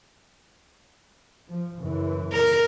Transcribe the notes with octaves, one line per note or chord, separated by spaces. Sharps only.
F3
F#2 C#3 E3
A#4